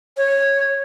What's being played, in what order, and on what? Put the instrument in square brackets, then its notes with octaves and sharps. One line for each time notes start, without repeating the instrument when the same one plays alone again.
[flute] C#5